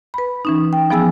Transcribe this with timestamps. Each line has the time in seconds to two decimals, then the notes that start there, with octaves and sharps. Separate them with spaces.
0.14 B4 B5
0.45 E3 C#4 D#4
0.73 G5
0.90 F3 B3 G#4 G#5 E6